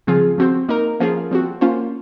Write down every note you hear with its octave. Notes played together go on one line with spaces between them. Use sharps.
C#3 F3 C4 F4 G#4
F3 C4 F#4 C5
A#3 D#4 A#4
F3 A#3 C#4 F4 G#4
F3 C4 F#4
A#3 C#4 F4 C5